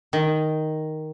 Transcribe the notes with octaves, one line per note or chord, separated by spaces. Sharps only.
D#3